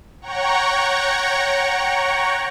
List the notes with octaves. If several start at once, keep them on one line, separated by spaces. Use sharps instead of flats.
C#5 F#5 G5 A#5 C#6